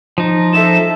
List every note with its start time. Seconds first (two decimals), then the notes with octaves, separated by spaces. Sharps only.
0.18 F3 D#4
0.53 A4 E5 E7